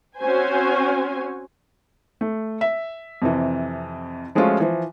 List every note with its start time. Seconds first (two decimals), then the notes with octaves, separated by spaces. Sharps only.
0.18 C4 C#4 F#4 C5 G#5
2.21 A3
2.61 E5
3.22 F2 C3 E3
4.35 F3 G#3 A3 C#4 F4 F#4
4.60 E3 F3